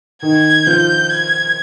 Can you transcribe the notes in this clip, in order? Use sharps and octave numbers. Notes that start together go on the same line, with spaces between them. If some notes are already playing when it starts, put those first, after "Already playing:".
D#3 D#4 G#6
F3 F4 G6
G#6